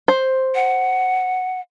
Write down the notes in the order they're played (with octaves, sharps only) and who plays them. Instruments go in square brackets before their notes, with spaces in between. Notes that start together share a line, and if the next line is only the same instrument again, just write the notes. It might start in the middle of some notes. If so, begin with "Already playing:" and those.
[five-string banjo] C5
[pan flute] F#5